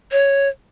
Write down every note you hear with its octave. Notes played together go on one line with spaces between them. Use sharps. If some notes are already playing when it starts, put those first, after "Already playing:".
C#5